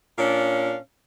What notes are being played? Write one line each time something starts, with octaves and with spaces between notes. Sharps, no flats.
A#2 C#4 D4 F5